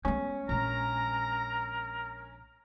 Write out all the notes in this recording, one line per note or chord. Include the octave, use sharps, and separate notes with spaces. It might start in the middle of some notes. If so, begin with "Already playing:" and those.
G#3 B3 C#4
A#1 G#3 A#4 A#5